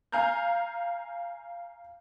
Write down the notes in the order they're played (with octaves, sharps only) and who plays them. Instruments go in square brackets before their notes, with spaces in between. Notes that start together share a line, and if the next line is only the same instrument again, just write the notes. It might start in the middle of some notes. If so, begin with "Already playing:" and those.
[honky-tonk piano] F5 G#5 A#5 F6 G6